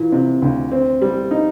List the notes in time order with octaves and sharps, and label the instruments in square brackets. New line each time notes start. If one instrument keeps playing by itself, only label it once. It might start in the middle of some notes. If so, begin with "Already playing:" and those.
Already playing: [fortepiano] A#2 E3
C3
D2
C4
G3
D#4